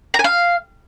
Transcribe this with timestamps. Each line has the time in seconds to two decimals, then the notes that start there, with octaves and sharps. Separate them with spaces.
0.14 A#5
0.19 G#5
0.24 F5